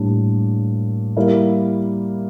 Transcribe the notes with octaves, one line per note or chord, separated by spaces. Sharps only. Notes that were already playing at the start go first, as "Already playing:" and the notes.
Already playing: A2 G3 A#3 D4
G3 A#3 E4